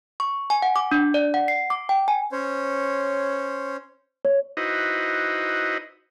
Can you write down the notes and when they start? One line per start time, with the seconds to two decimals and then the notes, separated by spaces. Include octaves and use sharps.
0.20 C#6
0.50 G#5
0.62 F#5
0.76 D6
0.92 D4
1.14 D5
1.34 F#5
1.48 C7
1.70 D6
1.89 G5
2.08 G#5
2.32 C#4 C5 C#5
4.25 C#5
4.57 D#4 E4 F#4 B4 C5 D#5